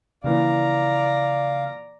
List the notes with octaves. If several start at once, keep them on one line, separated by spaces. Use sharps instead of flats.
A#2 C#3 E3 F3 D5 F5 A#5